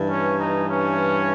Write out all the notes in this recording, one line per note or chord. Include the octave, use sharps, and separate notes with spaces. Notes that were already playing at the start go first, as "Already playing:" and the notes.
Already playing: G2 E3
C#4
D#4
C#4